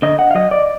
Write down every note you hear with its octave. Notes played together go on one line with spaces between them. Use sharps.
D3 D#5
F#5
F5
F#3 D#5
D5